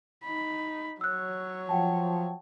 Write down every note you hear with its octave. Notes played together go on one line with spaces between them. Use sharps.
D#4 B5
F#3 C#5 E6 F#6
F3 F#5 G5 A5